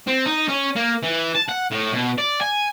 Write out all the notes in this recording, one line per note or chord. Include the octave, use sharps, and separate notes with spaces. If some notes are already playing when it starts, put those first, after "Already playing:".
C4
D#4
C#4
A#3
E3
A5
F#5
A2
B2
D5
G#5